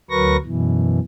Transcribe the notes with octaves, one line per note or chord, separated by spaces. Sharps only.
D2 F#3 A#4 B4 C#6 A#6
F#2 B2 E3